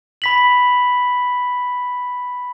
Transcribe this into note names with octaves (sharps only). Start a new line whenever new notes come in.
B5 B6 F#7